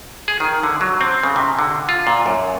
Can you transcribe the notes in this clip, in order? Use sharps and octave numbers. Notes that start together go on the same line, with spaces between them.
G#4
D#3
D3
F#3
C4
C#3
C3
D3
F4
A#2
F#2